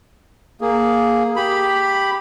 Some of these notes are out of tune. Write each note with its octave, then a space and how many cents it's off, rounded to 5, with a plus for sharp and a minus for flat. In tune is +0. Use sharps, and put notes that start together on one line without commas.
A#3 +0 G#4 +0
G4 +0 B5 +0